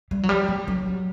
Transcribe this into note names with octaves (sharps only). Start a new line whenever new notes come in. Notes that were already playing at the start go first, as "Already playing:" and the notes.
G3
F#3
G3
F#3
F#3